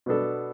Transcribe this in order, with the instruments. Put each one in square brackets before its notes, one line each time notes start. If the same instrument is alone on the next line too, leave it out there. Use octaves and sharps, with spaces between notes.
[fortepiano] B2 B3 D4 A4